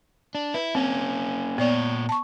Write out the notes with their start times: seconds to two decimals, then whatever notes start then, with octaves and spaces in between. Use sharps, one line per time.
0.35 D4
0.54 E4 B4
0.75 A#3 C4 C#4
1.58 A#2 B3 C#5 D5
2.09 A5 C#6